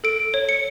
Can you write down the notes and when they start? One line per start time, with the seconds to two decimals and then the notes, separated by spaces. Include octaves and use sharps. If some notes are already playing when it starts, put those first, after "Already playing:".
0.04 A4 D7
0.34 C#5
0.49 C#7